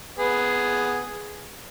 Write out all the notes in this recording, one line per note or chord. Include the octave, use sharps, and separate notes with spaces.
B3 G#4